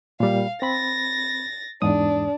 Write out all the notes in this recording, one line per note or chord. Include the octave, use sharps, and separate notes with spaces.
A#2 G3 F5
C4 B5 A6 A#6
E2 G#2 D4 D#6